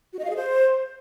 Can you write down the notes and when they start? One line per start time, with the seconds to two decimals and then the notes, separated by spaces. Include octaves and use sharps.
0.13 F#4
0.19 D#5
0.25 F5
0.30 G#4
0.36 C5